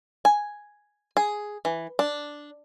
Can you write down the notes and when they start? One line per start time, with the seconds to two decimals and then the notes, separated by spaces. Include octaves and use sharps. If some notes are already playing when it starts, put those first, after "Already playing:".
0.25 G#5
1.17 G#4
1.65 E3
1.99 D4